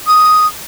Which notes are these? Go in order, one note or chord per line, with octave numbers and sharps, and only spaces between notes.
D#6